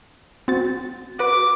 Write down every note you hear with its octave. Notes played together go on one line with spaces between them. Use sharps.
C4 F#4 A6
F#4 B4 D6